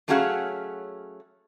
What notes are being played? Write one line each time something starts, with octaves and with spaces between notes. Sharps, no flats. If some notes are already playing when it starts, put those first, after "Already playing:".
F#3 A3 C#4 F#4 G#4 F5